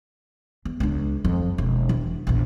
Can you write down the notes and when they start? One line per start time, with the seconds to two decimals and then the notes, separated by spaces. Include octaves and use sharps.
0.65 E2
0.80 C#2 D4
1.25 F2
1.58 E1
1.89 E3 D4
2.27 A#1 E2